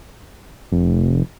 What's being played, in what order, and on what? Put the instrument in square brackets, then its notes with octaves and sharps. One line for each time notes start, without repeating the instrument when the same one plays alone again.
[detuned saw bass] F1